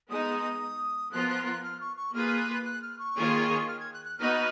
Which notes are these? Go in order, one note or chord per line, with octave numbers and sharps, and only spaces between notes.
G#3 B3 D#4 D#6
F3 B3 F4 A#4 F#6
F#6
F#6
F6
C#6
C#6
A#3 F4 G#4 B4 F6
F6
F#6
F#6
F#6
F6
C#6
D#3 A#3 F4 G#4 C#5
F6
G#6
F#6
F#6
B3 D#4 F#4 B4 F6